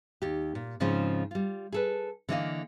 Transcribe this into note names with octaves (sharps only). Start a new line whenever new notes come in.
D#2 G4
A#2
G#2 C#3 F3 C4 C#4 C5
G3 F4
G#4 A4 B4
D3 E3 A#3 D5 D#5 F5